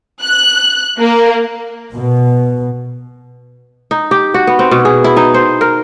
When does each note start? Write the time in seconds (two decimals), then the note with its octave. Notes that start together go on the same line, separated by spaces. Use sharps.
0.22 F#6
0.98 A#3
1.95 B2
3.91 D#4
4.11 G4
4.34 F#4
4.47 B3
4.59 C4
4.71 B2
4.85 G#4
5.04 E4
5.17 D#4
5.34 C5
5.61 A#4